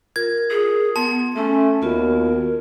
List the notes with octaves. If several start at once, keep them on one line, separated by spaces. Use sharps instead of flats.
F4 A#4 G#6
G#4
B3 A5 C6
A3 C#4
D#2 B3 F4 F#4 A#4